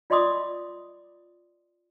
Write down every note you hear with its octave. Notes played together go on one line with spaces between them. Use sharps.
F4 D5 D#5 C6 D6 D#6